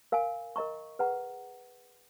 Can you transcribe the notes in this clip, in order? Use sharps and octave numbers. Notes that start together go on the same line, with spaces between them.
A#4 F5 G#5
A#4 D#5 A#5 C#6
G#4 B4 F#5 A#5